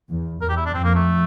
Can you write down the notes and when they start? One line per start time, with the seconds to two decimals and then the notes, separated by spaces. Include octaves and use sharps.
0.09 E2
0.41 E2 A#4
0.49 G4
0.57 E4
0.66 D4
0.73 F2 C4
0.84 A#3
0.95 A3